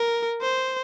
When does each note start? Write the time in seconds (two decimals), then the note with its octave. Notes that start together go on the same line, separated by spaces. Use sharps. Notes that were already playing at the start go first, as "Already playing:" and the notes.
Already playing: A#4
0.42 C5